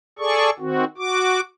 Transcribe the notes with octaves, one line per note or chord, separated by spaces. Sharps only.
G#4 A4 D5 C#6
D#3 C4 F#4
F#4 D6